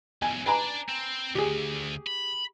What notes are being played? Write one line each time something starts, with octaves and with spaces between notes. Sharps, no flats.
B1 E2 G#5
D4 B4 D5 G#5 A#5
C4
D2 G4 G#4
B5